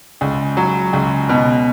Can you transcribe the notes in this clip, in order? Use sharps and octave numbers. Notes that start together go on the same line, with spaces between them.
C#2
F#3
C#2
B2